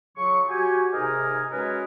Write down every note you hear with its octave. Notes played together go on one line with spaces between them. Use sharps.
C#3 F#3 F4 C#6
F#4 G4 G#5
G#2 C3 D#4 A#4 D#5 G#5
F#3 G#3 C#4 G#4 A#4 B4